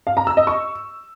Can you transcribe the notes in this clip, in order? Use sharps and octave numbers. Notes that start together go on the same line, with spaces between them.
F5
A#5
E6
D#5
C#6